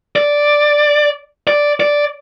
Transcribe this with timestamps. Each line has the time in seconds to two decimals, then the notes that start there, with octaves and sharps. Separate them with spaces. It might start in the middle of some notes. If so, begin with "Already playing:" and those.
0.16 D5
1.47 D5
1.80 D5